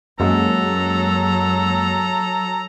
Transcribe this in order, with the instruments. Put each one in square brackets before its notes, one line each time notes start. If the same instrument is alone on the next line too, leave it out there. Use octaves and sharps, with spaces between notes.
[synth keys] F#2 G#3 A#3 [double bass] F#3 [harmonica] A4 A#5